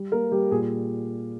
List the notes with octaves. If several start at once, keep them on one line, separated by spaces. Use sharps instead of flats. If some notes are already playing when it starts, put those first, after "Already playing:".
Already playing: G3
A#3 A#4
G3 G4
A#2 G#4